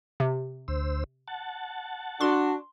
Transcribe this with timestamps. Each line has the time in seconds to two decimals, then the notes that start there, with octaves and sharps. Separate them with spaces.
0.20 C3
0.68 D2 C5 E6
1.28 F#5 A5
2.21 D4 F#4 C6